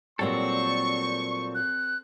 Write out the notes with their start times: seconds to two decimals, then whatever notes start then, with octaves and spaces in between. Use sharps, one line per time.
0.19 A#2 F#3 G3 C4 A4 C#6
1.55 F#6